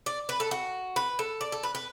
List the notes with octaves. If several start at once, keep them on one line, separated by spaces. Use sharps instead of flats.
D5
B4
A4
F#4
B4
A4
D5
A4
B4
B4